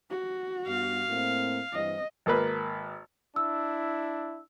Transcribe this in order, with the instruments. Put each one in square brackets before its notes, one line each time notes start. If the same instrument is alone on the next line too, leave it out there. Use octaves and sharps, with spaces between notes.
[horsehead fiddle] F#4
[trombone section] G2 B3 [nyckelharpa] F5
[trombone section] A2 A#3 C4
[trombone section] G2 E3 C4 [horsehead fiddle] D#5
[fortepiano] G#1 A#3 B4
[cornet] D4 [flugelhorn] E4 [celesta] E6